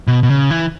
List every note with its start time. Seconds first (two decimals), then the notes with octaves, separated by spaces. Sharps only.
0.07 B2
0.23 B2
0.30 C#3
0.51 E3